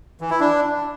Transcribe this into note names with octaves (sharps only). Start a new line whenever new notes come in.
E3
E4
D4